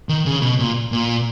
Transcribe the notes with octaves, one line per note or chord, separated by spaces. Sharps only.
D#3
C#3
B2
A#2
A#2